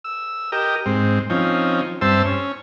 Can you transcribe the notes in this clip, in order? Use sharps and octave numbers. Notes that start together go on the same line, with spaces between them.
E6
G4 A#4 D#5
G#2 C4
F3 C4 C#4 D#4
G2 C4 C5 E5 A5 E6
C#4